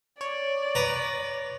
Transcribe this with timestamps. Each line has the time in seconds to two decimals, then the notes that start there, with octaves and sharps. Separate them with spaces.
0.21 C#5 D5
0.75 B4 A#5